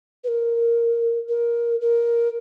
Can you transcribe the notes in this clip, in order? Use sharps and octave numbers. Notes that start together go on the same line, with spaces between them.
B4
A#4
A#4
A#4